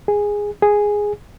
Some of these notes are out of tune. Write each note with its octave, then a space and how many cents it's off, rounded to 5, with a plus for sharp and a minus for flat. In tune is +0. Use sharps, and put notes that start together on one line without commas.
G#4 -10
G#4 -5